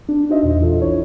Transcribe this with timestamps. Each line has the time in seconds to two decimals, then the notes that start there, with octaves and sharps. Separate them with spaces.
0.09 D4
0.29 D#4 F#4 C5 D#5 E5
0.43 E2 A#2
0.60 E3 F4 A4
0.82 A1 D4 E4 C#5